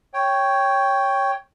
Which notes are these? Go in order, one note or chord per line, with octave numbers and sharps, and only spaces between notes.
C#5 G5